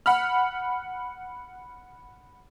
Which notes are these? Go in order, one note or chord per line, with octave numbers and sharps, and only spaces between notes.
F#5 B5 F6